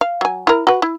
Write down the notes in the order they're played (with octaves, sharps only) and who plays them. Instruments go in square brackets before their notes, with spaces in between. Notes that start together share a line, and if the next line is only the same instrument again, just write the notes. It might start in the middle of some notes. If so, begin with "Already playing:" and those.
[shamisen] F5
F#3 G#5
E4 A#4
F#4 B4
E4